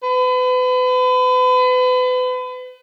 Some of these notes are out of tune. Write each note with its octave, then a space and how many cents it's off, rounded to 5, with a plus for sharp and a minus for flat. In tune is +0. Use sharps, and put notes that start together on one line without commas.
B4 +35